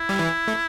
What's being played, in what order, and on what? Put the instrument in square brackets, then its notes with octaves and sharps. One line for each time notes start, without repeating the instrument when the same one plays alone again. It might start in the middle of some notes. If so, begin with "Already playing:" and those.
Already playing: [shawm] E4
[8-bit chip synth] G3
E3
A3